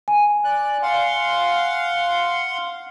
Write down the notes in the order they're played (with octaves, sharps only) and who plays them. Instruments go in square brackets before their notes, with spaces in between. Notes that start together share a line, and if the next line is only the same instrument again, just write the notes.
[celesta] G#5
[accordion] D5 F#6
F5 F#5 C6